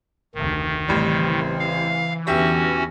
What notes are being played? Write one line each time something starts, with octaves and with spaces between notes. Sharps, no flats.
F1 D2 D#3
A1 C#3 E3 G3 C4
F5
E2 D3 C#4 F#4 G4 E5